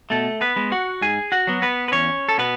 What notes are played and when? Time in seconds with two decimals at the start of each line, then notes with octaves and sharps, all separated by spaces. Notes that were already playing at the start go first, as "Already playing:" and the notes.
0.10 B2 A3 A4
0.41 B3 B4
0.56 G#3 B3
0.72 F#4 F#5
1.01 G#2 G#4 G#5
1.32 F#4 F#5
1.47 F#3 B3
1.62 B3 B4
1.88 B4
1.92 E2 C#4 C#5
2.29 A4
2.38 B2 B3 B4